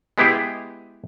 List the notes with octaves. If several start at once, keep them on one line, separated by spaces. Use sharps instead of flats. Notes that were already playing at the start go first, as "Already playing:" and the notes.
G#3 B3 E4 G4 G#4